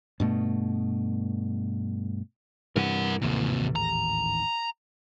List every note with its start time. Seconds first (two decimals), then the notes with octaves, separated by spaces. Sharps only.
0.20 G2 B2 A3
2.76 G2 C3 E3 A#4 F#5
3.22 A1 D#2 G#2 C3 A#3
3.76 A#5